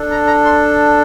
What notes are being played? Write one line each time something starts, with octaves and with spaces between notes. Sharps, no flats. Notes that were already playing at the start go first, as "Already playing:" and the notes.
Already playing: D4 A4
A#5
A#5
C6